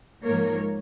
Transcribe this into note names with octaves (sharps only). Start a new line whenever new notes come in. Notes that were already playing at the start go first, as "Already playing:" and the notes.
G#2 F3 A#3 A#4 C#5